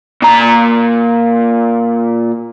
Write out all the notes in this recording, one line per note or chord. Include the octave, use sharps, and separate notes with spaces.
A#2 A#5